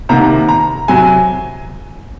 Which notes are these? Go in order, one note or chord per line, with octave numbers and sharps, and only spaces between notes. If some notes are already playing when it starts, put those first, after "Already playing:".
C2 C3 D#3 A#3 A#5
A#5
C3 F#3 G#5